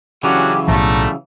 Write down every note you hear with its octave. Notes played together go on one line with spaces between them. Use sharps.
C#3 E3 F#3 C#4 D4 F#4 G4
B1 A2 F3 G3 A3 A#5